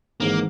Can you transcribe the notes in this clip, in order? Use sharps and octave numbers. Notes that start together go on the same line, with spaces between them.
G#1 G#2 E3 G#3 A#3